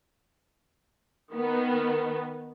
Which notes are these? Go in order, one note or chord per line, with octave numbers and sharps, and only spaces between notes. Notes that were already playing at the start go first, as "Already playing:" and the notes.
D#3 B3